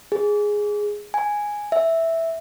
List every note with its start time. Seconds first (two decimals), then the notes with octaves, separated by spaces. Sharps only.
0.12 G#4
1.14 G#5
1.72 E5